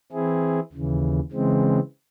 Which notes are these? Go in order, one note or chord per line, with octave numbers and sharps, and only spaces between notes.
E3 C4 E4 G#4
D#2 C#3 E3
C#3 E3 G#3 C4